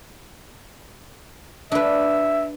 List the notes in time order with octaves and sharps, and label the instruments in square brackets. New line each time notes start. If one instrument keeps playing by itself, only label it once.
[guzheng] D4 B4 [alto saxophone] E5